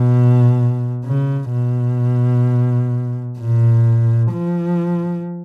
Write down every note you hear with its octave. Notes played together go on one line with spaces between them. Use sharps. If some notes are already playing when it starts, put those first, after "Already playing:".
Already playing: B2
C#3
B2
A#2
F3